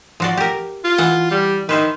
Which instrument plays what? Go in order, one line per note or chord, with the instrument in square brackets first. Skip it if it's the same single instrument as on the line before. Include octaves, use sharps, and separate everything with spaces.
[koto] F3 F#4 D5
G4 A#4
[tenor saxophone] F4
[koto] E3 F#5
[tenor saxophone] G3
[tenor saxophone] D#3 [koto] B4 C5 E5